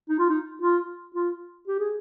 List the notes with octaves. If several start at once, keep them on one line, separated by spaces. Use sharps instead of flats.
D#4
F4
D#4
F4
F4
G4
G#4